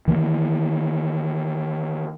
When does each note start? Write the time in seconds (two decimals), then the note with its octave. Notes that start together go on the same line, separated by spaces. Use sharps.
0.08 D#3 E3 A#3